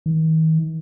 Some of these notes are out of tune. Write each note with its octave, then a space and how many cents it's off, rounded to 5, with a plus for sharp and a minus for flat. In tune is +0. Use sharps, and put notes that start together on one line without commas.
D#3 +40